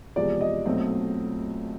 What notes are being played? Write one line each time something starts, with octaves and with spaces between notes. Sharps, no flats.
E2 C3 F3 G#3 D5
D#5
B1 A#2 F#3 A3 C4